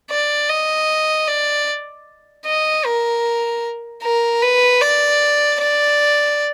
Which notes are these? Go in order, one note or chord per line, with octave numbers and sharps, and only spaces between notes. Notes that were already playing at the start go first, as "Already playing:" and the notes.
D5
D#5
D5
D#5
A#4
A#4
B4
D5
D5